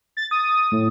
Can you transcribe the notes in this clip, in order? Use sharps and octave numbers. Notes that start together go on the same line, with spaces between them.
A6
D#6
A2